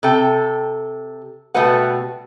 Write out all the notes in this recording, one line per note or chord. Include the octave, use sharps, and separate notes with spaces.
C3 A4 G5
B2 G3 A3 F#4 B4 F#5